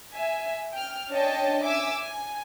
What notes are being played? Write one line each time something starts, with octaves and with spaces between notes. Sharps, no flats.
E5 G#5
G5 F6
C#4 D4 C#5 D#5 G5 A5
E5 G#5 D6 E6
G#5